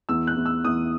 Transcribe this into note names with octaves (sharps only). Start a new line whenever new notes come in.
E2 E6
F#6
E2
E6
E2 D#6